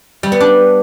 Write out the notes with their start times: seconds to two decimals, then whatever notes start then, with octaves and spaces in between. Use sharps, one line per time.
0.23 G3
0.32 B3
0.40 D4